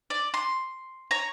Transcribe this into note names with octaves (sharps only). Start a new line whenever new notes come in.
D5
C6
C#5 A#5